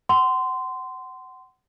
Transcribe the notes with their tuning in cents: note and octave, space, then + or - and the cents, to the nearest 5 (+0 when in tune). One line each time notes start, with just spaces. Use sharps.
F#5 +25 C6 -15